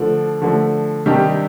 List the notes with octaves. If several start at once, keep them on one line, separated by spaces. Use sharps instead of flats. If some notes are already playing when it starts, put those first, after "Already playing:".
Already playing: D3 F3 A3 D4
D3 F3 A3 D4
C3 D#3 G3 D4 G4